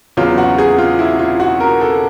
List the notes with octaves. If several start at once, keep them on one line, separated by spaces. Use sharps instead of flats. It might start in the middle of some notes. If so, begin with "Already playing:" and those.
E2 C#3 F#3 F4
F#4
G#4
F4
E4
F4
F#4
A#4
A4